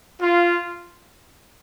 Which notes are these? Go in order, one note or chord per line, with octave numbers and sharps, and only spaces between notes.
F4